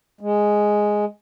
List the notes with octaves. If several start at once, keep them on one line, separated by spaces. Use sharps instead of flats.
G#3